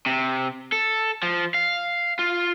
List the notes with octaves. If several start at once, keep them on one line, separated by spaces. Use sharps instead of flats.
C3
A4
F3
F5
F4